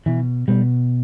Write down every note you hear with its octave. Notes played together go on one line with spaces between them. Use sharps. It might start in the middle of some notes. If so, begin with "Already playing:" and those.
B2 E3
B2 G3